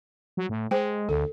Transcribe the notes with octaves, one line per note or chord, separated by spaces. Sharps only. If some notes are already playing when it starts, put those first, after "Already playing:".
F#3
A2
G#3 C5 G5
D2 A4